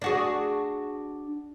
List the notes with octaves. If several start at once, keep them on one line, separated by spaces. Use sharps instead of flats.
D4 F#4 G#4